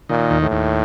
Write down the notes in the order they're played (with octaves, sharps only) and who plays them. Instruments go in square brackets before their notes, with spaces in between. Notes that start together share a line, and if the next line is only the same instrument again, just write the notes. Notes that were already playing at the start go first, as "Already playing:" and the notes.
[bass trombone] A#2 [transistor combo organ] D#3
[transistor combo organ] D#2
[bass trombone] A2
[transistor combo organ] D#2